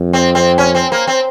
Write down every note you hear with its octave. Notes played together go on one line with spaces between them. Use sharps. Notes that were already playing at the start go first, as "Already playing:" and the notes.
Already playing: F2
C4
C4
C#4
C4
A#3
C4